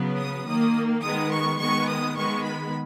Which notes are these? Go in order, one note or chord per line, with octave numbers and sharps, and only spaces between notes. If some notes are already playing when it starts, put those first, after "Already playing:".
Already playing: C#3 F#3 B3
D#6
D#3 A#3 D#6
D#3 G#3 B3 D#6
C#6
D#3 G#3 B3 C#6
D#6
D#3 G#3 B3 C#6
B5